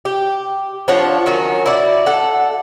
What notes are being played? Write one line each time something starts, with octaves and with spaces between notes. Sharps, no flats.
G4
F3 D4 C#5 F#5
D#3 F#3 C#4 F#4
E4 F#4 D5
A4 F#5